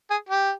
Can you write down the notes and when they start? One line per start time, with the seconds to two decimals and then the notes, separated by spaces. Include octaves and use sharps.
0.10 G#4
0.29 G4